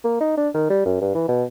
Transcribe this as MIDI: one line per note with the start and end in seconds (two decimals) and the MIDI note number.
0.04 0.20 58
0.21 0.37 63
0.37 0.49 62
0.54 0.68 51
0.70 0.81 55
0.85 0.98 42
1.01 1.14 43
1.15 1.25 52
1.28 1.44 47